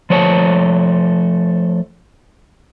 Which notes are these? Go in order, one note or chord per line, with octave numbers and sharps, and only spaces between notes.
F3 A3 C#5 E5 A5